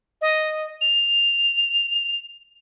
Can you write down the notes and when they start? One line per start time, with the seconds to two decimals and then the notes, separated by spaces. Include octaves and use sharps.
0.21 D#5
0.81 F7